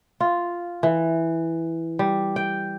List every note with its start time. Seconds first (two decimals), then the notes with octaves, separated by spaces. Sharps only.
0.20 F4
0.83 E3
1.99 G3
2.36 G5